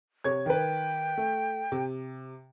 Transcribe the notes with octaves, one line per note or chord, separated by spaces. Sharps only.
C3 C#5 G#6
D#3 B4 G5
A3
C3